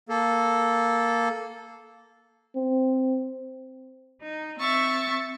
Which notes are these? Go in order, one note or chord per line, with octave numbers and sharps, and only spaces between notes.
A#3 A4
C4
D#4
C4 E5 C#6 A6